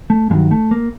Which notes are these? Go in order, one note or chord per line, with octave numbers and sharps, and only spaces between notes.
A3
G2 D#3 F#3 G#3
A3
A#3